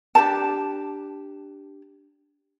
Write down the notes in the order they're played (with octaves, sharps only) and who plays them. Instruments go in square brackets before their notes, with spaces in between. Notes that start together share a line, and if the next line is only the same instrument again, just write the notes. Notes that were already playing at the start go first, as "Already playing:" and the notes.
[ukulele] D4 G4 A4 A5